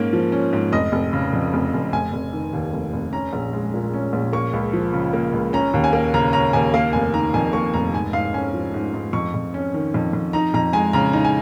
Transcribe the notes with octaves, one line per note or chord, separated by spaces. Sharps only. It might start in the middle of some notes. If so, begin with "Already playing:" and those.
Already playing: G#2 A#3 C#4
F3
C#4
G#2
F1 D#5
F1
C#3
F2
F1
F1
F1 G#5
F1
D#3
D#2
F1
F1
C#4 A#5
A#1
G#3
A#2
C#4
A#1
A#3 C#6
C#2
F3
C#3
A#3
C#2
C#4 A#5
D#2
G#5
A#3
C#3 A#5
C#4 A#5
D#2 G#5
A#3 F5
F1 G#5
D#3 A#5
F2 G#5
A#3 C#6
F1 A#5
G#2 G#5
G#2 F5
C#4 G#5
F3
G#2
G#2
F2 C#6
F2
C#4
D#3
F2
F2
D#4 A#5
F2 A#5
G#3 G#5
C#3 A#5
D#4
G#5